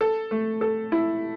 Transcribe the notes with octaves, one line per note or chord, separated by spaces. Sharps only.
A4
A3
A4
E4